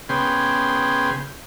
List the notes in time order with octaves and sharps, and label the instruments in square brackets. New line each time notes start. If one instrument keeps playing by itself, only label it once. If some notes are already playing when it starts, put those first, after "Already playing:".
[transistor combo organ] C#3 B3 G#4 G5 C6